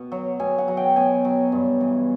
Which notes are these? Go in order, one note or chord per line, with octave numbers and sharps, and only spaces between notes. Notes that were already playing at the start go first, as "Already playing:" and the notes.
Already playing: B2
F#3
B2 G#5
F#5
F#3
G5
B2 G#5
F#3
G2
E3